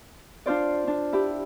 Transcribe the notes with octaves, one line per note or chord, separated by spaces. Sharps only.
D4 F4 C5 D5
D4
E4 G4